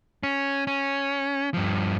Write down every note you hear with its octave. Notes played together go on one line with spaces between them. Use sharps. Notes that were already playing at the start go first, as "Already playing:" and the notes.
C#4
C#4
G2 F3